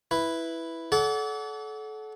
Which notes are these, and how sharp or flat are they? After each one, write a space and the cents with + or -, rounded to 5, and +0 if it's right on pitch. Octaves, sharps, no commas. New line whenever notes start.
E4 +0 B4 +0
A4 -30 D5 -40 F#5 +0